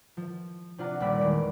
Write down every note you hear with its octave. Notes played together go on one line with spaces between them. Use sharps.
F3
C3 D4 F4 F#5 A#5
A#1 D#2 G3 D5 B5 E6
E2 D#3 G#3 D7